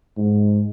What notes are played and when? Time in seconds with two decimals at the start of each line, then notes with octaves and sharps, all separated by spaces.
0.17 G#2